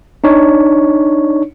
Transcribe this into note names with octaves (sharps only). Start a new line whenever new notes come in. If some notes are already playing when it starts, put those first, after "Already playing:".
D4 D#4 C#5